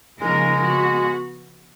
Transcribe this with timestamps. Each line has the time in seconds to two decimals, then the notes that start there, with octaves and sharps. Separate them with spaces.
0.20 C#3 F3 G#3 A#3 D#4 A#4
0.41 G#3
0.62 B3 F#4